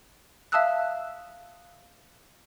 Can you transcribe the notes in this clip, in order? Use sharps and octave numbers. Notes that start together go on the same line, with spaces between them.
E5 F5 A5 D#6 E6 F#6